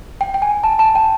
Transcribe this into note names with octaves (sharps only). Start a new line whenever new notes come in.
G5
G5
G#5
A5
A5
G5